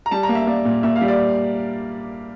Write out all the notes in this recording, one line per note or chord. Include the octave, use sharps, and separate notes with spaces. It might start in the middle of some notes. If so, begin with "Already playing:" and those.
A#5
G3 A5
A#5
A#3
E5
A#3 D5
A#2
A#2 E5
F5
G3
D5